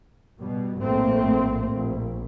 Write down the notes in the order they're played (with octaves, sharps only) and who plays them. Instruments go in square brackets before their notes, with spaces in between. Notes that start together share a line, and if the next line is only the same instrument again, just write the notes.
[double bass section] B2 G3
A#1 A2 A3 A#3 C4
A#1